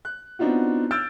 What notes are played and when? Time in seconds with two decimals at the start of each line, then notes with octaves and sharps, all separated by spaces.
0.05 F#6
0.39 B3 C4 D4 D#4 F4 F#4
0.91 E6 F6 G6 A6 D7